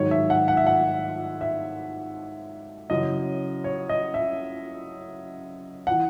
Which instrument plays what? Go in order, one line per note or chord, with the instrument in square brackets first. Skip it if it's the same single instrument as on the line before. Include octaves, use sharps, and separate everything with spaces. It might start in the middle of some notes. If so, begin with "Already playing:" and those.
Already playing: [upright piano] G#2 D#3 F#3 C#5
E5
F#5
F#5
E5
F#5
E5
F#2 C#3 E3 D#5
C#5
D#5
E5
E3 F#5